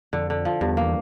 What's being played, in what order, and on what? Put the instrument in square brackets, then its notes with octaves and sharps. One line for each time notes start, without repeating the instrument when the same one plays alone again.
[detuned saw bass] F2 [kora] D3
[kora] D3
F3
[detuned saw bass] E2 [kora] G2
[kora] A#3